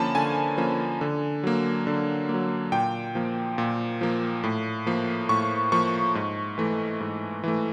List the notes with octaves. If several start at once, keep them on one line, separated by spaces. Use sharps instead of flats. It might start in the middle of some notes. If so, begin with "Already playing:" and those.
Already playing: D3 F3 A#3 C#4 G#5 A5 B5
D3 G#5
F3 A#3 C#4
D3
F#3 A#3
D3
F#3 A#3
A#2 G5
F3 A#3
A#2
F3 A#3
A2
F3 A#3
A2 C#6
F3 A#3 C#6
G#2
E3 A3
G#2
E3 A3